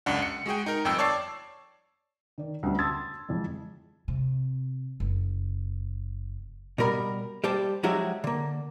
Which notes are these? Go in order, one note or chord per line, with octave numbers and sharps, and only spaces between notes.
C#2 F#2 D4 F#5
C#7
G#3 F#4 G#4 G5
D#4 A#4
G1 F2 G5 E6
C#5 D5 A5 C#6 E6 C7
D#3 D5
D2 G3 B3 C#4 F#4
A5 C6 D#6 E6 G#6 A6
F2 E3 G#3
C3
F#1
B2 G3 A#4 B5
G3 G4 C5 A5
F3 F#3 G#3 F#4 G4 E5
D3 A#3